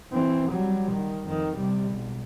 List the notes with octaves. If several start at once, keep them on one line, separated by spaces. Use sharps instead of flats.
E3 C4
F#3 G3
D#3
F2 D#3
C3 G3
B1